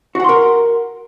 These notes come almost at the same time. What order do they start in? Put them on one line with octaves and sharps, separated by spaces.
F#4 F#5 C6 A#4